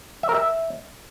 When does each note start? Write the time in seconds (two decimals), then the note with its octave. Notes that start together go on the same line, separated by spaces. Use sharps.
0.23 E5
0.29 A#4
0.35 E5